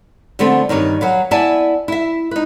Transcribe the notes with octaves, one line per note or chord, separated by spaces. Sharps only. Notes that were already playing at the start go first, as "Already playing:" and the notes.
D3 F3 A3 B3 C4
G2 D#3 G3 C#5
F#3 B4 F5
B3 E4 D5 E5 G#5 A5
E4 E5
D#4 B4